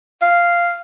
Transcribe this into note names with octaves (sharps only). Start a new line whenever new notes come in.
F5